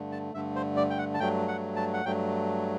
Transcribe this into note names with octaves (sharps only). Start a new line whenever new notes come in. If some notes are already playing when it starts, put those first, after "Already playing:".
Already playing: G2 D3 A3
A5
G2 D3 A3 E5
C5
D5
G5
F#5
A5
G2 F#3 A3 G5
F#5
A5
F#5
G2 F#3 A3 G5